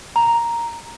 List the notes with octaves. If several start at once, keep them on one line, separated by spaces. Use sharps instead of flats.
A#5